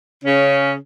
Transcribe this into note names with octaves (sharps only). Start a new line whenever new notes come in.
C#3 C#4